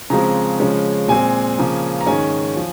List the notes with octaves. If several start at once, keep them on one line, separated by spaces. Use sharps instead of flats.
C#3 F3 G#3 C4 A#5
C#3 F3 G#3 C#4
A#2 G#3 C4 G#5
C#3 F3 A#3
A#5
G#2 D#3 G#3 C#4 G#5
F3